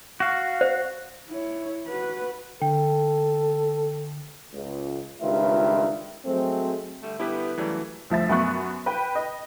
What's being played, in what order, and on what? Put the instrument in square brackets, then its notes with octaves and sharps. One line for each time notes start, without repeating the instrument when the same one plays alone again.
[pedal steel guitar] F#4 F5
[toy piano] C5
[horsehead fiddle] E4 C#5
F#4 B4
[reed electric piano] D3 [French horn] A4 [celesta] G5
[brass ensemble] C#2
C#2 G2 D#3 F4 B4 E5
F#3 G#3 A3 C4
[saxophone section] D3 G3 A3
[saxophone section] D3 G3 B3 [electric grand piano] E4 G4 B4
[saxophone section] F#2 C#3 G3 [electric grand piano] E3 F#3 A3
[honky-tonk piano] D2 F3 E5 A6
F#2 B3 C#6 F#6
B4 G5
D#5